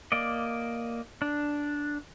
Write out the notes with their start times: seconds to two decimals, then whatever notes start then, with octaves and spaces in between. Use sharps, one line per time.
0.12 A#3 D5 D#5
1.22 D4